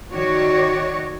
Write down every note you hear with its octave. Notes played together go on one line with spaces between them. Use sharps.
D#3 F#4 C#5 D5